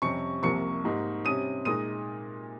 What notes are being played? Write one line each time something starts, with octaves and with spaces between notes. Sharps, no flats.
F2 C3 G3 C#4 C#6 C#7
C2 C3 F3 A#3 C#6 C#7
G#2 G3 A#3 D#4
C3 G3 C#4 D#6 D#7
A#2 G#3 D#4 D#6 D#7